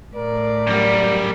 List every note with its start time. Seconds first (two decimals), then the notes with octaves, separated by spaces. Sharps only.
0.16 A2 A#4 D5
0.67 F#2 G3